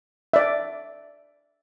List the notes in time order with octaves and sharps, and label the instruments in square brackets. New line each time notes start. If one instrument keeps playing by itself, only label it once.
[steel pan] D5 E5